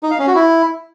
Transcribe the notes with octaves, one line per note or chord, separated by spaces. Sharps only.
D#4
F5
C#4
F#4
E4